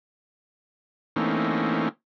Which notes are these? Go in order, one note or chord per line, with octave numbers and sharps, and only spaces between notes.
E3 A3 A#3 C4 C#4 D#4